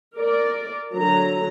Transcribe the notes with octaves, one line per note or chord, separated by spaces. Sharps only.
A#4 D5
D3 F#3 A#5